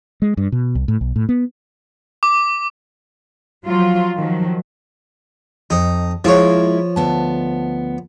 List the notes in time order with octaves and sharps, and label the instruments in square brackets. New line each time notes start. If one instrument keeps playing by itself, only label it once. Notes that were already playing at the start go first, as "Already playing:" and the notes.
[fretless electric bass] G#3
G2
B2
C2
A2
B1
A2
B3
[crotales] D6
[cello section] F3 F#3 F4
D#3 F3 F#3
[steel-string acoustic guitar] F2 [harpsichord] D#4
[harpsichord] F3 C#5 [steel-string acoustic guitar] G#3 A#3 E4
[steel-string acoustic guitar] D2 B3 A5